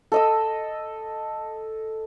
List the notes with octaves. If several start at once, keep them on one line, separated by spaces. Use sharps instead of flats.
A4 D#5 E6